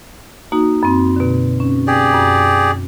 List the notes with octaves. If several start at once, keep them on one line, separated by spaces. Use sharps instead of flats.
A#3 D#4 F#4
F#2 C4
B2 D3
C#4
G4 G#4 D5
F#2